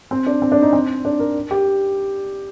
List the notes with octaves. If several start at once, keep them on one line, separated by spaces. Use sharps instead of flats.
C4
D4
C4
D4
D#4
C4
D4
A#4
G4